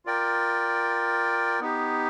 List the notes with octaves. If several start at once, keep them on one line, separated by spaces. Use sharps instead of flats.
F4 A#4 D5 G5
B3 D#4 G4